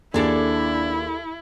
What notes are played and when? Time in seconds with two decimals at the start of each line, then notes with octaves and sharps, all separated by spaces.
0.14 D#2 D4 E4 G#4 A4 D5